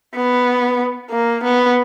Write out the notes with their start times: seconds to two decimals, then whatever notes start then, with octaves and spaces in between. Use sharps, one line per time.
0.16 B3
1.11 A#3
1.44 B3